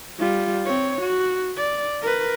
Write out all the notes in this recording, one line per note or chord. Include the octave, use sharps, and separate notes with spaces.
G3 F4
C4 C#5
F#4
D5
A#4 B4